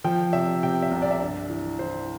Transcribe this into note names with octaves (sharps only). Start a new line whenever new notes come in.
F3 G5
C3 E5
C3 G5
E5
C2
D5
E5
G2 D5
E3
E3 C5